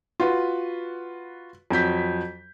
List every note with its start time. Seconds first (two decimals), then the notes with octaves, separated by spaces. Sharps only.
0.20 F4 F#4 B4
1.70 F2 F#3 G6 B6